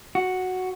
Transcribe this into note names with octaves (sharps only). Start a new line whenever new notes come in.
F#4